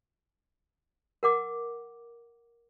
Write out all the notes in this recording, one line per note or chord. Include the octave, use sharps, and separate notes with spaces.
A#4 F#5 D6